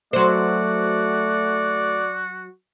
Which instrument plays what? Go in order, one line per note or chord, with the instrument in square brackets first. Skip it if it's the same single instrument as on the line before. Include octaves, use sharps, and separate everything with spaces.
[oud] F#3 C5 [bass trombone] A3 [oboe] F#4 [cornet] D5